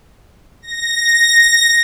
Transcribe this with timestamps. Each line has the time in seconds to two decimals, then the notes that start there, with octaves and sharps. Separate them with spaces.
0.62 A#6